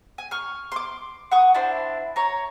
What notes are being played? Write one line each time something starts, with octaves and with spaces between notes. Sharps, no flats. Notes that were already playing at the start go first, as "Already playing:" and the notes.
G#5
C#6 F6
C6 D6
F#5 C#6 D#6
D4 E4 C5
C#5 A#5